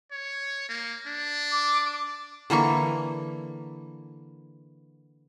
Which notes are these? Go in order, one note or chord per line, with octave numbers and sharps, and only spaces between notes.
C#5
A#3
D4
D6
D3 E3 A#3 C#6